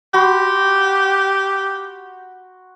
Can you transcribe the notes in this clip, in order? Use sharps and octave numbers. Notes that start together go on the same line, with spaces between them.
F#4 G4 B5 C6